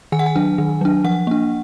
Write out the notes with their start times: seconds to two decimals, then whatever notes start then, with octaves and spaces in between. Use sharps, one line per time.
0.12 D#3 G#5
0.19 F#5
0.26 G#5
0.36 F#3 D4
0.58 D#3
0.81 F#3 D4
1.04 F3 F#5
1.27 A#3 D4